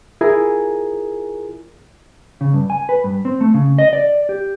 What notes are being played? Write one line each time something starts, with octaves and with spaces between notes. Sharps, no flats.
E4 F4 G#4 A#4 G#5 A#5
C#3
G2
G#5
B4
G2
C4
A3
C#3
D#5
D5
G4